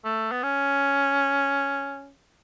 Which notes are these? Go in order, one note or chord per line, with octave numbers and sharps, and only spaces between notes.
A3
B3
C#4